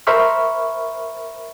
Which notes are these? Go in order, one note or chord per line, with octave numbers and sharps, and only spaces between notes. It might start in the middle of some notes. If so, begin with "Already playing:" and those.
A#4 C5 E5 B5 C#6 F6